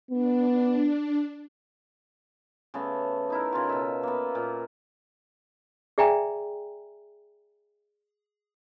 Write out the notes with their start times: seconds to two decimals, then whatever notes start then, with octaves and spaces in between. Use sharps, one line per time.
0.11 B3 D4
2.74 C#3 A3 B3
3.30 D#4 E4 A#4
3.53 C#3 F4 F#4
3.69 B2 E5
4.03 A#3 B3
4.35 A#2
5.98 G#4 D5 E5 G5 G#5 A#5